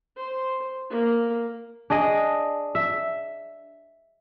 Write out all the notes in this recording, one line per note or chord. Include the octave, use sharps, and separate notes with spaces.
C5
A#3
D4 G#4 D#5
E5